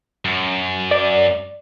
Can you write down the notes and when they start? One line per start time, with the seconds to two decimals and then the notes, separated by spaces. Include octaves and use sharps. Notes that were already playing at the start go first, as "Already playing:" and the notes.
0.25 F#2
0.91 D5